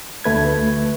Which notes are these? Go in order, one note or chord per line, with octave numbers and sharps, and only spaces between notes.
D2 A3 B4 G#6